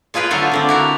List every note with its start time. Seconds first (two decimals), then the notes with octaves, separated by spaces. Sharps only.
0.14 G#3 F4 G#4 B4 G5
0.31 D3 F#3 A3 F4 A4
0.52 D3 C4 D4
0.69 E4 F#4 A#4